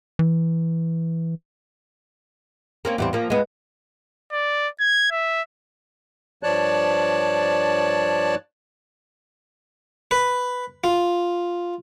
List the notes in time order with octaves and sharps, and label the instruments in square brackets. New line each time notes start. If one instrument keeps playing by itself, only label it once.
[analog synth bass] E3
[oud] A#3 C4 C#4
E2 G3 C4
F3 A#3
G#3 B3
[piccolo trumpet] D5
G#6
E5
[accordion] G2 F3 C#5 D5 A5 F#6
[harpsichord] B4
F4